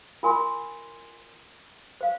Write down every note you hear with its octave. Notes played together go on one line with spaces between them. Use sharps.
F4 A#4 G#5 C6
C5 F5